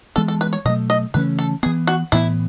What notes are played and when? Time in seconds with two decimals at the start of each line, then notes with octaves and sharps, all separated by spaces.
0.16 E3 G#3 B3 A4
0.28 A4
0.41 B4
0.53 C#5
0.65 B2 F#3 A3 D#5
0.90 D#5
1.14 C#3 E3 A3 C#4 B4
1.39 A4
1.63 B3 G#4
1.66 E3
1.87 F#4
2.12 A2 E3 B3 E4